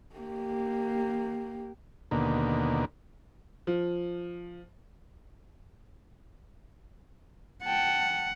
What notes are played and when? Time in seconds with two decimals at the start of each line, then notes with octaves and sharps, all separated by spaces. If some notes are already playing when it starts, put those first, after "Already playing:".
0.16 A#3 G4
2.11 D#2 B2 D3 A#3
3.67 F3
7.65 F#5 G5 A5